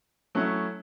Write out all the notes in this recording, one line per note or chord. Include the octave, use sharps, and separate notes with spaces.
F#3 A3 C#4 E4